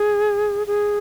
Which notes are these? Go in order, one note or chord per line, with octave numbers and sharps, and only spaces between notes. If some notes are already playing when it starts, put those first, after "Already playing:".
Already playing: G#4
G#4